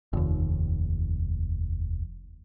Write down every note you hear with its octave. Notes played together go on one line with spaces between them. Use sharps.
F1 D#2